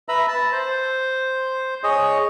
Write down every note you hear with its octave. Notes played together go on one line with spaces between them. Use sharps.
B4 E5 A#5 B5
A5
C5
G#4 C#5 D#5